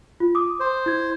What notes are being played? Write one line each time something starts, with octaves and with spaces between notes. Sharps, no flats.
F4
D6 D#6
C5
E4 G#6